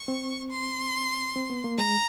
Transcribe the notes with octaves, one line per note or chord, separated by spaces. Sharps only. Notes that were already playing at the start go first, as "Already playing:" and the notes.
Already playing: C#6
C4
C6
C4
B3
A#3
G#3 A#5